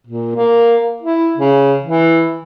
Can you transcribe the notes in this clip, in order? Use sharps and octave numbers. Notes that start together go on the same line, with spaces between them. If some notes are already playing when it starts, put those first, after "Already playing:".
A#2
A#3
E4
C#3
E3